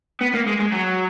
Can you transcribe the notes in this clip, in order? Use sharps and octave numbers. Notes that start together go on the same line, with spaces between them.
B3
A#3
G#3
G#3
F#3